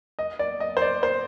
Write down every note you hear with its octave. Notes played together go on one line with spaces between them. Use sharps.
D#5
D5
D#5
C5
D5
C5